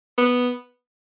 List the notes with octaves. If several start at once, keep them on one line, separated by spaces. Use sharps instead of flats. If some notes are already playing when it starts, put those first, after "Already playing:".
B3